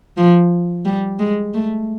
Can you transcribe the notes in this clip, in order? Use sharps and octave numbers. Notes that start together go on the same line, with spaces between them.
F3
G3
G#3
A3